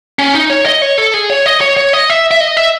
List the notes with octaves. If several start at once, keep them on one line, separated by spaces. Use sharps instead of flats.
C#4
D#4
C#5
D#5
C#5
A4
G#4
C#5
D#5
C#5
C#5
D#5
E5
E5
D#5
E5